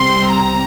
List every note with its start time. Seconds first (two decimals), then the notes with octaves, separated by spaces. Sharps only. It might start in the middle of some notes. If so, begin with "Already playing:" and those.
Already playing: C2 C3 G3 C4 C6
0.34 A#5